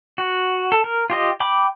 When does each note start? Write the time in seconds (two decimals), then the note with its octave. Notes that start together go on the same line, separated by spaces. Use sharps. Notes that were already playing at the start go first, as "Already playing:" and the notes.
0.18 F#4
0.72 A4
0.84 A#4
1.10 F4 G4 D#5
1.40 G5 B5 D6